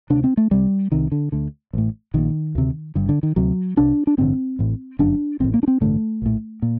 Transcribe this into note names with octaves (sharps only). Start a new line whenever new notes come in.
D2 C3 D4
C4
A3
C2 C3 G3
C2 C3 D#3
D3
D2 D3
A1 A2
A#1 A#2 D#3
D2 C3
G1 G2 D3
D3
D#3
D2 C3 F#3
C2 C3 D4
D4
A1 G2 D3 C4
A1 A2
G1 F#2 D3 D4
A1 A2 C4
A#3
D4
C4
A1 G2 D3 A3
A#1 A2
A#2